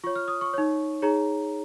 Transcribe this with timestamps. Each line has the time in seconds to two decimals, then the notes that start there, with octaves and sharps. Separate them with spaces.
0.04 F4 C#5 C#6
0.16 F6
0.28 D#6
0.41 C#6
0.54 D#4 C#5
1.02 D#4 G#4 C#5 A#5